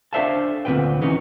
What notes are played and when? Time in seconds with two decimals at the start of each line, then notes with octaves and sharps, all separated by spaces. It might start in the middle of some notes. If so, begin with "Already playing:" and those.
0.13 D4 A4 C5 E5 F5 A5
0.65 D2 A#2 C#3 C4 B4 G5
1.01 D#3 E3 C#4 D#4 B4